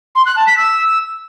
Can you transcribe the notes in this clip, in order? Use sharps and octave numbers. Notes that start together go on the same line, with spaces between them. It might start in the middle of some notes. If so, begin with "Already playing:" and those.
C6
F#6
A5
B6
E6